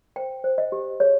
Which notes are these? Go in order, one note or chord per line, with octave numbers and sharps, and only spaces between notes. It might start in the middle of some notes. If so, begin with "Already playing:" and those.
C5 G5
C5
D#5
G4
G#4 C#5